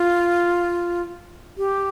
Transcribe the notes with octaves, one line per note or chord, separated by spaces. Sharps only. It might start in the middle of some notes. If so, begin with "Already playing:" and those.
Already playing: F4
G4